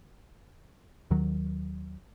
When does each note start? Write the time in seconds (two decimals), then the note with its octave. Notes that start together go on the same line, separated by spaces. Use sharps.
1.10 D#2 D#3 F#3